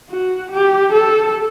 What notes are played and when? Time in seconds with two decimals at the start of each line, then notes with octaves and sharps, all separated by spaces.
0.10 F#4
0.51 G4
0.93 A4